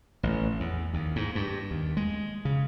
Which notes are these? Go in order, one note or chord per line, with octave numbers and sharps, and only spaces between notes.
A1
E2
D#2
G#2
G2
D#2
G#3
C#3